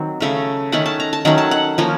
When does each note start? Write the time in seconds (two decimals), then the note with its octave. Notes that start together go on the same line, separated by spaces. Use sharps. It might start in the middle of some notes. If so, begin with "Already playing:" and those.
Already playing: D#3 F#3 C4
0.20 C#3 A3 C#4
0.72 D#3 A3 C#4 F#5
0.86 A5
1.00 A#5
1.13 A5
1.25 D#3 F#3 A3 C#4 F#5
1.38 A5
1.51 F#5
1.78 F3 A#3 C#4